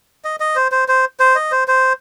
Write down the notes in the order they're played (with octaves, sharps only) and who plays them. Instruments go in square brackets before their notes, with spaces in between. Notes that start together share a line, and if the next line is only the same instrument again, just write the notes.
[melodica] D#5
D#5
C5
C5
C5
C5
D#5
C5
C5